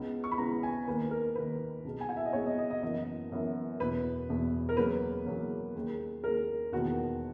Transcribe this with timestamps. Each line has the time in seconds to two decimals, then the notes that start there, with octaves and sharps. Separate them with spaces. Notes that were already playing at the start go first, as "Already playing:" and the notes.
Already playing: C#2 C#3 G#3 B3
0.24 C#6
0.32 B5
0.38 C#2 C#3 G#3 B3 A#5
0.63 G#5
0.88 D#2 D#3 A#3 B4
1.11 A#4
1.35 D#2 D#3 A#3 B4
1.84 B1 B2 G#3
2.01 G#5
2.09 F#5
2.16 E5
2.25 D#5
2.33 B1 B2 G#3 C#5
2.46 D#5
2.58 D#5
2.70 D#5
2.83 F#1 F#2 E3 B3 D#5
3.31 F#1 F#2 E3 B3
3.80 E1 E2 B2 B4
4.29 E1 E2 B2
4.69 A#4
4.77 E2 C#3 F#3 A#3 B4
5.26 E2 C#3 F#3 A#3
5.75 D#2 C#3 G#3
6.23 D#2 C#3 G#3 A#4
6.72 E1 D#2 D#3 G#3 B3 F#4